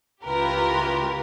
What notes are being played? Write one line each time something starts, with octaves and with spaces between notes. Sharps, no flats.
C#2 E4 F4 G4 A#4 B4